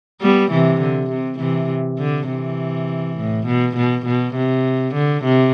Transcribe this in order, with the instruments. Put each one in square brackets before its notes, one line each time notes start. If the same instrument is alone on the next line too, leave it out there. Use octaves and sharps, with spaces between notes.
[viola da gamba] G3 B3
C3 E3
D3
C3
C3 E3
D3
C3 E3
A2
B2
B2
B2
C3
D3
C3